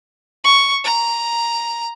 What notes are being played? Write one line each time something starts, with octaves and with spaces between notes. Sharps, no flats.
C#6
A#5